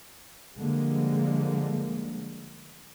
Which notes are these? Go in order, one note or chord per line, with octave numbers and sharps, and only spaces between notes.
D3 F3 G3 G#3 A#3